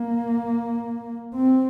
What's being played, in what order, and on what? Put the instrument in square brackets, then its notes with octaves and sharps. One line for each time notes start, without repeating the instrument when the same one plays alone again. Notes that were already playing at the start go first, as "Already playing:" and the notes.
Already playing: [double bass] A#3
C4